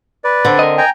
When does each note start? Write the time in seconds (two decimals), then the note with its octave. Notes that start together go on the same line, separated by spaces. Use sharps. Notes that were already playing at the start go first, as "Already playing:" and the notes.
0.24 B4 D5
0.45 D3 C4
0.59 A#4 D#5
0.78 G5 G#5 A#5